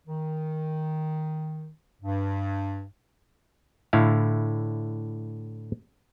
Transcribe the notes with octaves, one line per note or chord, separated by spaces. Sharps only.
D#3
G2
A2 D3 E4 F5